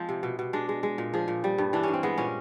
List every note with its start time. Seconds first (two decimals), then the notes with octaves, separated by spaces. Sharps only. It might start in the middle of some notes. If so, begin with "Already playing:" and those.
Already playing: F3 G#3 C4
0.09 C3
0.23 B2
0.39 B2
0.53 G#3 D4
0.69 G#3
0.83 G#3
0.98 A#2
1.14 F3 G#4
1.28 A#2
1.44 G3
1.58 G2
1.73 E3 D4
1.83 G2 C#4
1.93 C4
2.03 G#3 B3
2.18 A#2 C#4